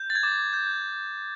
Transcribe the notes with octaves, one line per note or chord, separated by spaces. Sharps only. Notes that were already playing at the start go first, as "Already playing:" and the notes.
Already playing: G6
A6
G#6
D6
G6